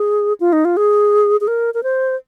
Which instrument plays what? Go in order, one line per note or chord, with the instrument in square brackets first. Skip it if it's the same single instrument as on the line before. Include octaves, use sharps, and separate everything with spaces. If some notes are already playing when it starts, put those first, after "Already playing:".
Already playing: [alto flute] G#4
F4
D#4
F4
G#4
G#4
A#4
A#4
C5